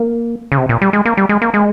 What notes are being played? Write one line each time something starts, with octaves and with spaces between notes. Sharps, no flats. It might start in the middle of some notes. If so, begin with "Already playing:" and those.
Already playing: A#3
C#3
C3
A#2
G3
G#3
A#3
G3
G#3
A#3
G#3